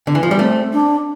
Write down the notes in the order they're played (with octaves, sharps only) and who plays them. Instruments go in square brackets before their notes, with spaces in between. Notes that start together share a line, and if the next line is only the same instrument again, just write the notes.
[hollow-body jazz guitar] D3
E3
F3
G3
[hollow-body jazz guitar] A3 [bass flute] C4
[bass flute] D4